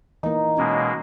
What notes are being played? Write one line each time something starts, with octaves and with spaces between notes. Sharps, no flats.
E3 A#3 D#4
B2 G#3 A#3 C#4